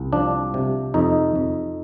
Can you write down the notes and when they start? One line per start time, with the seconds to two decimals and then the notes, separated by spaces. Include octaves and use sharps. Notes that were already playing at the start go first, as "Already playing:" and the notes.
Already playing: C2
0.13 F3 D4
0.54 C3
0.94 F2 D#4
1.36 F2